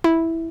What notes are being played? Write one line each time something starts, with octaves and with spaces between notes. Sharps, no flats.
E4